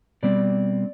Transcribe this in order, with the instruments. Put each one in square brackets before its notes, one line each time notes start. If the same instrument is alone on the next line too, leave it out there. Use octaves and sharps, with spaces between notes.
[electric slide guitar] B2 G3 C4 D5